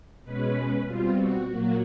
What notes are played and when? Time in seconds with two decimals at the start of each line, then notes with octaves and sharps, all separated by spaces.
0.24 B2 G#3 C#4 B4
0.85 B2 G3 C4 F4
1.16 F#4
1.47 A#2 F#3 A#3 F#4